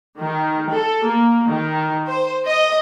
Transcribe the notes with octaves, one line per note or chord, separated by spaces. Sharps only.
D#3
A4
A#3
D#3
C5
D#5